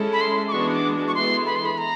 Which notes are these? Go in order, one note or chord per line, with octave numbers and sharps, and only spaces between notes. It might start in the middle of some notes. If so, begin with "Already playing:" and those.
Already playing: G#3 C#4 E4 A4
B5
C6
D6
E3 G#3 B3 D4 F#4 C#6
D6
C#6
E3 G#3 B3 E4 A4 C6
B5
C6
B5
A#5